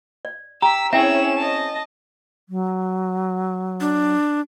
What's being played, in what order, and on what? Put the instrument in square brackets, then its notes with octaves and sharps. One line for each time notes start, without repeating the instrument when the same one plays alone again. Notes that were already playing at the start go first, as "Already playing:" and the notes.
[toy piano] D5
[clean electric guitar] G4 [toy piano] A#5 [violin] E6 B6
[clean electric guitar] C4 G#4 [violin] C#4 E7 [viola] E4 C#5 [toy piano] E5 G5
[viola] D#5 A5
[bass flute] F#3
[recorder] D4